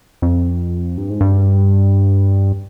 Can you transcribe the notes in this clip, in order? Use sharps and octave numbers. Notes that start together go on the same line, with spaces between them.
F2
G2
G#2
G2